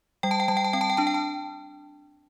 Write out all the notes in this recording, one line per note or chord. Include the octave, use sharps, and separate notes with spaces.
G3 G5
A5
G5
G3 A5
G5
A5
C4 G5
A5
G5
D4 A5
G5
A5